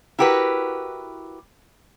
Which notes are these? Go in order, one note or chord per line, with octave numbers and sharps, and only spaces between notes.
E4 F#4 G4 A#4 B4